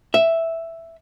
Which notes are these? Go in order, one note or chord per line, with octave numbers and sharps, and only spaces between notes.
E5